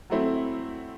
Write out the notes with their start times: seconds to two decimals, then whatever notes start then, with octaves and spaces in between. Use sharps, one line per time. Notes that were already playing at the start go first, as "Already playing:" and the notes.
0.10 F#3 A3 C4 E4